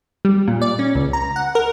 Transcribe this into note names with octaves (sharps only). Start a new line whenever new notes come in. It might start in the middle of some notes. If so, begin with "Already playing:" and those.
G3
A#2
D5
C#4
C#2
A#5
F#5
A#4